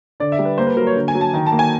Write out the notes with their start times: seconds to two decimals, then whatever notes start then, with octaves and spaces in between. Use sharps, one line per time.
0.20 D3 D5
0.32 E5
0.39 G3
0.45 B4
0.58 A#3 C5
0.67 B4
0.77 F#3 A#4
0.87 C#5
0.95 D3
1.08 G#5
1.15 F#3
1.21 A5
1.34 D#3
1.46 A5
1.52 A#3
1.59 G#5